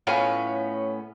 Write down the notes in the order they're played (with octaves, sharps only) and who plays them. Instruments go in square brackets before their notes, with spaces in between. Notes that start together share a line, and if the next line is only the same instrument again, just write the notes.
[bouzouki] A2 B3 C#4 [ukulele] F4 G#5